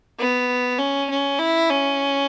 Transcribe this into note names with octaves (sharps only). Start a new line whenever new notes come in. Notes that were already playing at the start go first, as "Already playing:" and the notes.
B3
C#4
C#4
E4
C#4